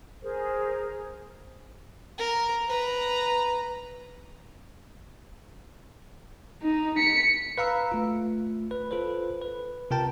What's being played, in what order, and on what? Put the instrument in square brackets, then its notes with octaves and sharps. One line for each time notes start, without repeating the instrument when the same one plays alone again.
[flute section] G#4 A#4 C5
[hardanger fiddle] A#4
B4 A#5
[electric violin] D#4
B6 C#7
[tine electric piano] B4 F5 A#5 E6
A3 F4
B4
F4 A4 B4 C5
B4
C3 F4 A#4 G5 A5